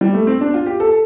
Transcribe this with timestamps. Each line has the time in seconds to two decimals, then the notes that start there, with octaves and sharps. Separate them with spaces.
0.01 G3
0.14 A3
0.27 C4
0.41 D4
0.54 F4
0.66 G4
0.80 A4